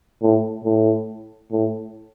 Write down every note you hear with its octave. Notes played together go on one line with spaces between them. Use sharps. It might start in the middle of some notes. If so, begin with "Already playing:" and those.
A2
A2
A2